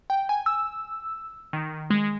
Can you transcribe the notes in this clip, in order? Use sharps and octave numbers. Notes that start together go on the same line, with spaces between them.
G5
G#5
E6
D#3
G#3